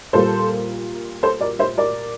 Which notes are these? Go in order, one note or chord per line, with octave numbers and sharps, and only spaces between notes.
A#2 G3 A#3 A4 C5
A4 C5
A#4 D5
C5 E5
A#4 D5